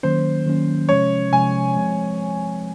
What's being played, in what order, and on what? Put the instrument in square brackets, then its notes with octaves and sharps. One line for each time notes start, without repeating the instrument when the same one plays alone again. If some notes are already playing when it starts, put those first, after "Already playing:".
[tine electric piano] D#3 F#3 A#3 C#4 [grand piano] C5
[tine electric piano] D#3 F#3 A#3 C#4
[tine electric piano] C3 F3 G#3 C#4 [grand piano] C#5
[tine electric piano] C3 F3 G#3 C#4 [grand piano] G#5
[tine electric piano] F3 G#3 C4